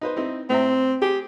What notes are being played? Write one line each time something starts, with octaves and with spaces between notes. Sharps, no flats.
D#4 B4 C5
C4 D#4 E4
A2 C4 E5 A#5
G4 G#4